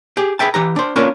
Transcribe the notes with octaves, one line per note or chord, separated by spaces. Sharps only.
G4 G#4
G#4 B4 E5 G5 A5
E3 G4 A#5
D4 C5
A#3 C#4 D4 F4 A#4 B4